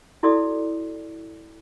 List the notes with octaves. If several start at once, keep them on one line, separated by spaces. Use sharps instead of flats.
E4 F#4 A4 D5 D6 D#6